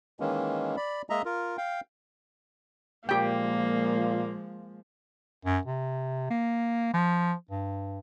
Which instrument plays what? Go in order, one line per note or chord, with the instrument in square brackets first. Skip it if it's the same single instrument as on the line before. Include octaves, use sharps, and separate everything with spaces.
[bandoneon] D#3 E3 G#3 A#3 C#4
D5 B5
G#3 A#3 D#5 E5 A#5
F4 A#4
F5 G5
[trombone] A#2 [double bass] F3 G#3 [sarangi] A#3 [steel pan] G4 G5
[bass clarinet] F#2
C3
A#3
F3
G2